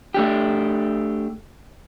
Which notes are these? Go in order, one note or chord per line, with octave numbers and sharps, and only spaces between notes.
A3 D4 G4